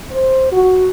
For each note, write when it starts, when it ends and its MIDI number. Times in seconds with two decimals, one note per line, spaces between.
0.11 0.52 72
0.52 0.90 66